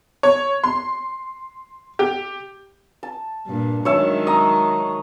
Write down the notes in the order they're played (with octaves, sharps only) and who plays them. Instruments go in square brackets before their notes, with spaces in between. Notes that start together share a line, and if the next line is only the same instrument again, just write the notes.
[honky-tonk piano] C#5
C6
G4
[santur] A5
[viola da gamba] G2 A#2
[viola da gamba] D#3 F#3 G#3 [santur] C#5 E5 A5
[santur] D#5 A#5